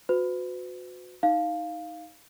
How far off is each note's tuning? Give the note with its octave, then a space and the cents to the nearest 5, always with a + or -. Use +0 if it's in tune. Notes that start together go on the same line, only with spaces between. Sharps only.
F#4 -30 B4 +40
D#4 +10 F5 +0